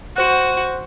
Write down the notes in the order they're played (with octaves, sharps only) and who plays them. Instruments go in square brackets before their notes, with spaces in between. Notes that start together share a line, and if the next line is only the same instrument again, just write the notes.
[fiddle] F#4 [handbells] C5 F#6